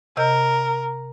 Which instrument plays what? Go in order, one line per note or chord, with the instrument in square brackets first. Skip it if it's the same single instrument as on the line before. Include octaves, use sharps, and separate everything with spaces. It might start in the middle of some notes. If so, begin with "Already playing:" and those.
[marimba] C3 D#5 G6 [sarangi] A#4